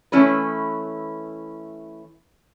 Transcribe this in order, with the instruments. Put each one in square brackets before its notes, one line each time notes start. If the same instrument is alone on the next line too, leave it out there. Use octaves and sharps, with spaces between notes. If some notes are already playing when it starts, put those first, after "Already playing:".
[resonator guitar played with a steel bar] E3 A3 C#4 E4 B4